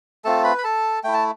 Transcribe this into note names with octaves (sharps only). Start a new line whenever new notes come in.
A3 C4 F4 A4 A5
B4 B5
B5
A4 A5
A3 E4 G5
A5